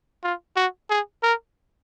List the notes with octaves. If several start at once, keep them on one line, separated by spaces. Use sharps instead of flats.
F4
F#4
G#4
A#4